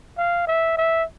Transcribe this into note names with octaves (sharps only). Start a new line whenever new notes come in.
F5
E5
E5